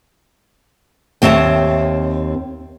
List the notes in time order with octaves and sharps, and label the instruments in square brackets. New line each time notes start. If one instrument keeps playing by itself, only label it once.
[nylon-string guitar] D#2 C4 C#5 E5 A5